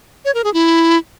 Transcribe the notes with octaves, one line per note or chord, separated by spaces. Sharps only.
C#5
A#4
G#4
E4